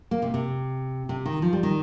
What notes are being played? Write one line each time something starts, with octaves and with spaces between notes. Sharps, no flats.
A#3
C3
C3
C3
D#3
F3
G3
D#3